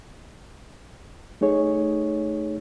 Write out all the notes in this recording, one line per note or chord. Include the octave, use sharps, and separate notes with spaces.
A3 D#4 G#4 C#5